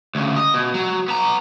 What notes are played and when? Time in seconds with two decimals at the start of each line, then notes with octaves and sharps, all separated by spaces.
0.15 D2 C#3
0.36 D#5
0.54 B2
0.74 F#3
1.08 B3 A#5